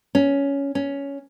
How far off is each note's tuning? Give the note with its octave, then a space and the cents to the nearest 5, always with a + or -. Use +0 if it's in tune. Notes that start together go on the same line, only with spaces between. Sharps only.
C#4 +10
C#4 +10